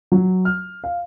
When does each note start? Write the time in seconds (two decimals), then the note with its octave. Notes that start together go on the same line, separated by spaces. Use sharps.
0.12 F#3
0.45 F6
0.84 F5